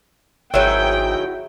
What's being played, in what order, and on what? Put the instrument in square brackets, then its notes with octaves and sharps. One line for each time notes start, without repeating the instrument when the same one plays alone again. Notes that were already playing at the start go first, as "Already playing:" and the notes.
[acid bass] G#1 [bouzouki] D#3 F#3 G#4 [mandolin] E4 F#4 E5 [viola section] G5